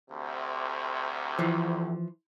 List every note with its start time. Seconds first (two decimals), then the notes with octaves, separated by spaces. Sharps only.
0.11 D2 C3
1.39 E3 F3